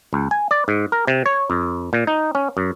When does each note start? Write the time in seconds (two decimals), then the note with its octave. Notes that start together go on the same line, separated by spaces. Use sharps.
0.13 C#2
0.31 G#5
0.51 D5
0.68 G#2
0.92 A#4
1.08 C3
1.26 C#5
1.50 F2
1.93 A#2
2.07 D#4
2.35 C#4
2.57 F#2